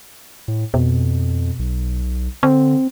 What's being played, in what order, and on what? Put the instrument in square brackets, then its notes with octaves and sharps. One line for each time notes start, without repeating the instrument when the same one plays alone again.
[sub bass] A2
[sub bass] F2 [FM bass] B2
[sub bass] B1
[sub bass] D3 [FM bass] C4